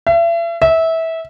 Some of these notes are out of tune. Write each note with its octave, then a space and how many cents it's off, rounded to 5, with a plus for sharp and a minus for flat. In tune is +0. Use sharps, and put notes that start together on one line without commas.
E5 +40
E5 -20